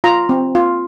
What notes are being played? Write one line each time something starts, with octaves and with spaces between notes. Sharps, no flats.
F4 A#5
C4
F4